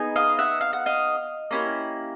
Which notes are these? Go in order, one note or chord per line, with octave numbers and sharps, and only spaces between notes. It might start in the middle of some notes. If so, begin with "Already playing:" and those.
Already playing: B3 D#4 G#4
D#5 F5
E5 F#5
F5
F#5
D#5 F5
A#3 C#4 E4 G4